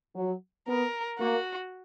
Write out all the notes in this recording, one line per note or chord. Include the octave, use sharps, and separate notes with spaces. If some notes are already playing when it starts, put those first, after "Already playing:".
F#3
B3 A#4
A#3 F#4